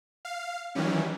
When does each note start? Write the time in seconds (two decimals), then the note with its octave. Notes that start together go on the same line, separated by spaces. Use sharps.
0.25 F5
0.75 D#3 E3 F#3 G3 C#4